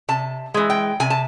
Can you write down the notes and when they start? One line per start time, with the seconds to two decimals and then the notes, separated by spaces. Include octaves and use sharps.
0.09 C3 A5
0.54 E3 G#3
0.70 G5
1.00 C3 G#5
1.10 A5